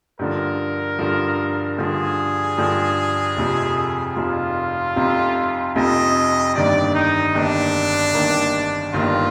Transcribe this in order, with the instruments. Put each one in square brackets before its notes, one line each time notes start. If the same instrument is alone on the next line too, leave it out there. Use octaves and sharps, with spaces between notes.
[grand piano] G2 D3 F3 [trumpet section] A#4
[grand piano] G2 D3 F3
[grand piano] G2 D3 F3 [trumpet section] G#4
[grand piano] G2 D3 F3
F1 F2 C3 F3
[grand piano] F1 F2 C3 F3 [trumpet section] F4
[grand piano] F1 F2 C3 F3
[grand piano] F1 F2 C3 F3 [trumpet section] D#5
[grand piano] G1 G2 D#3 A#3 [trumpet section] D5
[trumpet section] D#4
[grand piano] G1 G2 D#3 A#3 [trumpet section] D4
[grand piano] G1 G2 D#3 A#3
[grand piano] G1 G2 D#3 A#3 [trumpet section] F4